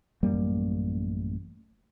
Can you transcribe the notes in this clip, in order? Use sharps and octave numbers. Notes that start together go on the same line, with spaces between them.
A1 F#2 G3 A#3